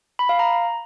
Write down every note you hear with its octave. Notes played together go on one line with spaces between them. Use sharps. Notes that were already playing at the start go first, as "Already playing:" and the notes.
B5
F5
A#5